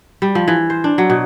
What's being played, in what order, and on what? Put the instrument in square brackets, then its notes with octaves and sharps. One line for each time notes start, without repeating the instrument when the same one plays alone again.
[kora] G3
F3
E3
C5
D4
F#3
B2